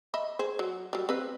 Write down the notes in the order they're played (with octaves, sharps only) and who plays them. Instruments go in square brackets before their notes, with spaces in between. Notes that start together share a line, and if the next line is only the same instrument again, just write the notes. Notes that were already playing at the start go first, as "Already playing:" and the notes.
[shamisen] D#5 E5 B5
G#4 C5
F#3
F#3 G3
C4 B4 F5